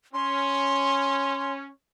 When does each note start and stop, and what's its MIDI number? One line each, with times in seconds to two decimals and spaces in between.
0.14 1.68 61
0.14 1.53 84